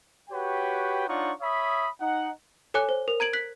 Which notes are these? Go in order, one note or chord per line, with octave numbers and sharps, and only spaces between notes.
F#4 G4 B4 C#5 G5
D4 D#4 F4 C#5 F#5 C#6
C#5 E5 B5 D#6
D#4 F#5
A4 C#5 G#5 D6 F#6
C5
A#4
A#5 G#6 D7 F#7
F#6 B6 F#7